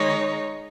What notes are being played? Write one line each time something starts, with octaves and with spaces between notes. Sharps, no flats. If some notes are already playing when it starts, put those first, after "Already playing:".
Already playing: D#3 G#3 D#4 C#5